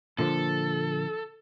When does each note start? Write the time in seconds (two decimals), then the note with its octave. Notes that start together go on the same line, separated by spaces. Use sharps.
0.18 A#2 D3 F3 A4